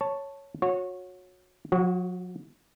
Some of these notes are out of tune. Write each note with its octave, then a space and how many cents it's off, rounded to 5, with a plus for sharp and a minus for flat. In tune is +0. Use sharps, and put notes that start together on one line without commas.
C#5 +0 A5 +0
F#4 -30 C#5 -10
F#3 -40 F#4 +15